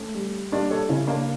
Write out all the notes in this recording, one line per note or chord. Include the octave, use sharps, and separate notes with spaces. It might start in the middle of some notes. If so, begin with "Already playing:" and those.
Already playing: A3 C#4
G3
G3 A#3 D4
A4 C#5
C#3 C#4 E4
A#3 D4